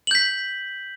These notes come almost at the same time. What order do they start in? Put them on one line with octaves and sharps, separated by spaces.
F#7 G6 B6